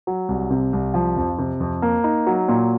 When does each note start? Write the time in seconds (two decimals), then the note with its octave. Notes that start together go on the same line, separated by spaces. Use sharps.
0.07 F#3
0.29 C2
0.50 C3
0.73 C2
0.94 F3
1.17 F2
1.38 C3
1.60 F2
1.82 A#3
2.04 D#4
2.27 F#3
2.48 A#2